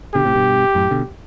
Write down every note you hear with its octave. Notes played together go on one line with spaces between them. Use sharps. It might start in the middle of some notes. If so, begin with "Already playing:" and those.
B2 D3 G4
A2 C3
G2 B2
F#2 A2
B2 D3